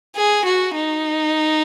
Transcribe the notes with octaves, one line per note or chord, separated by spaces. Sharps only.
G#4
F#4
D#4